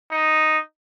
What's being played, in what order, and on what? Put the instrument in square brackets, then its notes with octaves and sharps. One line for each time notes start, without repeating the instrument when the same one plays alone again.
[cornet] D#4